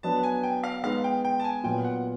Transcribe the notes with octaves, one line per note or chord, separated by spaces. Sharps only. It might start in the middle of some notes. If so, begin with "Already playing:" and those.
F#3 B3 D4 A5
G#5
G5
F5
G#3 B3 D#4 F5
G5
G5
A5
G#5
A#2 F#3 B3 G5
F#5